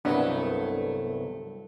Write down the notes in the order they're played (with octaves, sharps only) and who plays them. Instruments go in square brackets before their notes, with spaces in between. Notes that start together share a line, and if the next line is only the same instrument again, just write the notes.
[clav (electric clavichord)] C2 G2 F#3 [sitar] A3 [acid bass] B3 [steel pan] D4 D#5